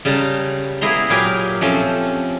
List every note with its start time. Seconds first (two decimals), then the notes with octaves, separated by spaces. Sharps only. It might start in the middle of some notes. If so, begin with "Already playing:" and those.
0.05 C#3 G3 A5 A#5
0.81 A#3 B3 E4 G#4 A#5 C6
1.10 A#2 F#3 G4 A#4 F5 G#5
1.61 F3 A3 C4 C#4